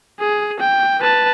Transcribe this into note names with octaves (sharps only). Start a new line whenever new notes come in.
G#4
G5
B4 A5